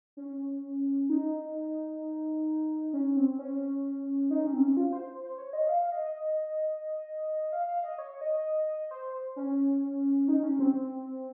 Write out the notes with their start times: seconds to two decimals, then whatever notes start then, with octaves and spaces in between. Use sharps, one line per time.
0.17 C#4
1.10 D#4
2.93 C#4
3.16 C4
3.39 C#4
4.31 D#4
4.47 C#4
4.54 C4
4.61 C#4
4.77 F4
4.93 C5
5.23 C5
5.38 C#5
5.53 D#5
5.69 F5
5.80 F5
5.92 D#5
6.03 D#5
6.15 D#5
7.52 F5
7.68 F5
7.84 D#5
7.99 C#5
8.21 D#5
8.91 C5
9.36 C#4
10.28 D#4
10.43 C#4
10.59 C4